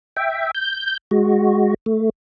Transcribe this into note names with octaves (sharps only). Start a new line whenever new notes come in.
E5 G5
G6
G#3 F#4
A3